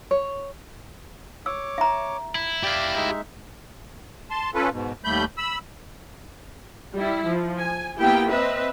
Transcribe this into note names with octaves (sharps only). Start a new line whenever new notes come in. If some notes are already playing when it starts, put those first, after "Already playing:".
C#5
C#5 D6 E6
E5 A#5
E4
G4 D5 F5
G#3 D#4 E5
A5 C6
C#4 F4 A4 B4
G#2 B2
D#2 G3 A3 B5 G6
B5 E6
G3 E4
F3
G#5
A#3 B3 E4 G4 G5
C4 B4 D#5 E5